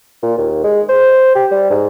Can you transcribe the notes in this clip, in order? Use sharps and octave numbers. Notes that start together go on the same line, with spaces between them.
A#2
D#2
G#3
C5
G4
G3
G#2